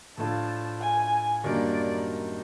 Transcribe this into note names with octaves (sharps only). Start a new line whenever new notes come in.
A2 F3 A3 D4 F4 A5
G#5
F#2 D#3 G3 A#3 D4 D5